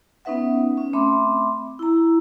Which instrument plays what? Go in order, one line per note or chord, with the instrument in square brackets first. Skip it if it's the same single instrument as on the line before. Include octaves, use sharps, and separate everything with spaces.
[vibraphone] B3 C#4 D#4 B4 E5 F#5
C#4
A3 C4 E5 B5 C6 D6
E4 A#5